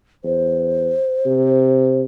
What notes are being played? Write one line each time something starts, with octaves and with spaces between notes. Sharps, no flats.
E2 C5
C3